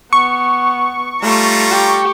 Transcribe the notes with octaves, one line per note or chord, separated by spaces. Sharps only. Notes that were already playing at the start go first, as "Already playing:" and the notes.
B3 C#6
G3 A3 F4 A#5
G4